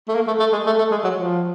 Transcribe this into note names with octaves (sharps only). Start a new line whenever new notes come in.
A3
A#3
A3
A3
G#3
A3
A3
G#3
F#3
F3